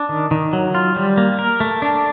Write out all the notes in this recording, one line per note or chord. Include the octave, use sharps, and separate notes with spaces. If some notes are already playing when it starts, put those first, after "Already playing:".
Already playing: D4
D#3
D#3
F#3
F4
G3
A#3
A#4
A3
D4